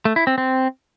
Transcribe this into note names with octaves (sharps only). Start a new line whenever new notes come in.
A3
E4
C4
C4